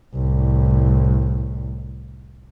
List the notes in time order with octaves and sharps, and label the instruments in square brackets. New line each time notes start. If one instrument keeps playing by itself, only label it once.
[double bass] C2 A2